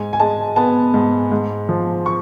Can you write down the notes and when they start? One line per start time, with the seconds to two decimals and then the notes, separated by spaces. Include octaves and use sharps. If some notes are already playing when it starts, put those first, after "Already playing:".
Already playing: G#2 G#5
0.13 G#5
0.20 G#3 A5
0.56 B3 A5
0.94 G#2
1.32 G#2
1.69 F3
2.06 C#6